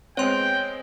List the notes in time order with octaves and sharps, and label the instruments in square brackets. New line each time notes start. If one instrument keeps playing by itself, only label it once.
[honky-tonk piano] G#3 B3 C4 [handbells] C#5 C6 [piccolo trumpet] G5